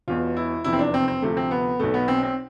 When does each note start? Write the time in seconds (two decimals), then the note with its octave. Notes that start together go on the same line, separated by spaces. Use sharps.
0.08 E1 E2 B2 F4
0.37 E4
0.64 F1 E2 C3 F3 E4
0.73 C4
0.79 D4
0.94 C4
1.08 C4
1.22 D2 C3 F3 A3
1.37 C4
1.51 B3
1.79 B1 B2 A3
1.94 B3
2.08 C4
2.23 C4